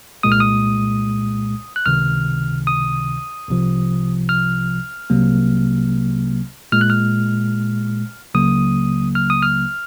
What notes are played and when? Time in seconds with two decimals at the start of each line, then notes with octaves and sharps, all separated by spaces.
0.23 C2 A#2 G#3 D#6
0.32 F6
0.40 D#6
1.76 F#6
1.86 C#2 C3 D#3 F6
2.67 D#6
3.48 C2 C3 F3
4.29 F6
5.10 C2 C3 F#3 A#3
6.72 A#2 G#3 F6
6.81 F#6
6.90 F6
8.34 C#2 C#3 F#3 A#3 D#6
9.15 F6
9.30 D#6
9.43 F6